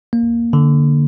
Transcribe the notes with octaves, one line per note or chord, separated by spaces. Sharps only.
A#3
D3